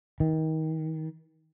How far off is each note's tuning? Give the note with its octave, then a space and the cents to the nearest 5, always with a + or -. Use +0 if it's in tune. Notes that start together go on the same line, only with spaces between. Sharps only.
D#3 +30